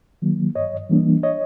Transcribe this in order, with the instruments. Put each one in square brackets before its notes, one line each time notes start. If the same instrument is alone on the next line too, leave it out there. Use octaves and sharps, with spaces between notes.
[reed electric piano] D#3 F#3 A#3
G2 C#5 D#5
E3 G3 A#3 D4
C#5 D#5